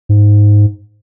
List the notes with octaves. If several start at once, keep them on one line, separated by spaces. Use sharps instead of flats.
G#2